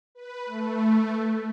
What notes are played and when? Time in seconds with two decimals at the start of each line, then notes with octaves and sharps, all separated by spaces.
0.15 B4
0.46 A3